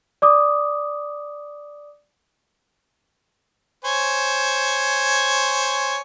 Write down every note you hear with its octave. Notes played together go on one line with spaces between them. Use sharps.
D5 D6 D#6
C5 C#5 G#5